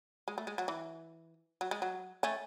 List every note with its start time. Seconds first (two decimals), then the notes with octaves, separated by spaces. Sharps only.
0.28 G#3
0.38 A3
0.47 G#3
0.58 F#3
0.68 E3
1.61 F#3
1.71 G#3
1.82 F#3
2.23 A3 C#4